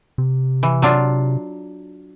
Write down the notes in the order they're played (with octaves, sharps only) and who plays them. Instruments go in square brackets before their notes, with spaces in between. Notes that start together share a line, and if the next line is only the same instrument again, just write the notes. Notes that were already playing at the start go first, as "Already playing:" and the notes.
[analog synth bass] C3
[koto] E3
F#3 D4 F4